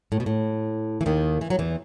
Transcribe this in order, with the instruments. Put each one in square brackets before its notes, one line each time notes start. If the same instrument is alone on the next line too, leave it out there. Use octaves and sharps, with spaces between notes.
[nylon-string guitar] A2
B2
A2
E3
D#2 D#3
E3
F#3
E2 E3